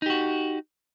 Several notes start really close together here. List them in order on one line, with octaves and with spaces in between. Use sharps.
D#4 G4 F#4